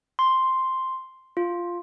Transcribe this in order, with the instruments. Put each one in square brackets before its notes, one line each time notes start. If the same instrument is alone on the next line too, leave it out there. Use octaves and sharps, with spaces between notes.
[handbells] C6
F4